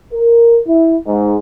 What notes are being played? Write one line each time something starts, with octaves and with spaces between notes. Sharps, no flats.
A#4
E4
G#2